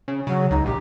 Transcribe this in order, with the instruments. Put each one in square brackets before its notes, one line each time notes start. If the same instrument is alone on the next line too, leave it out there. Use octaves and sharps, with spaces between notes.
[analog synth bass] C#3
[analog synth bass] C#3 [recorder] F#3
[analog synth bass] C#2 [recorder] D#4
[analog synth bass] A#1 [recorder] G4